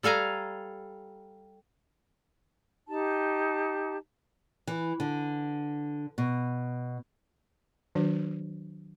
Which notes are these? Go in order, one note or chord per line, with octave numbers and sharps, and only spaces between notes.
G3 A4 F5 G#5 A#5
D#4 G4 A5
E3
D3
B2
D#3 F#3 D4 F#4 C5